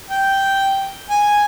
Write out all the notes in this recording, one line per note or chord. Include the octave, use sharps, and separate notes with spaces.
G5
G#5